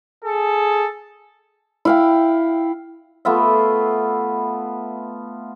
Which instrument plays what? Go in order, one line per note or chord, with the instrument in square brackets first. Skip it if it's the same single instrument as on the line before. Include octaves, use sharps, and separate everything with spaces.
[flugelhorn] G#4 [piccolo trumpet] A4
[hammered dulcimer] E4 F5 G5
A3 B3 F4 E5